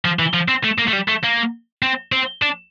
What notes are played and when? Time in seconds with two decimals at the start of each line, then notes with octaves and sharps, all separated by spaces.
0.05 F3
0.19 E3
0.34 F3
0.49 C4
0.64 A3
0.79 A#3
0.88 A3
0.93 G3
1.09 A3
1.24 A#3
1.83 C4
2.12 C4
2.42 D4